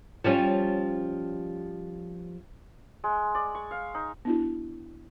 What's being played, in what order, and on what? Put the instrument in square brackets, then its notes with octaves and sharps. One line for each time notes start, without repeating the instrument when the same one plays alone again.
[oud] F3 G3 C#4
[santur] G#3
D5
C#6
F5
D#4
[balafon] B3 D4 E4 F#4